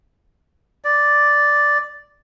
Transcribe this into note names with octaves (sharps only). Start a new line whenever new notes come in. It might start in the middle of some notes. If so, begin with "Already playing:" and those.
D5